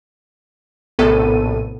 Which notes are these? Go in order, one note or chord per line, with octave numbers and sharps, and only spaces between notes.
A#1 A2 C3 B3 A4 D#7